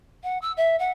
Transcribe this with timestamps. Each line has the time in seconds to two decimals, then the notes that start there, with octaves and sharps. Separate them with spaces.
0.23 F#5
0.42 E6
0.57 E5
0.79 F#5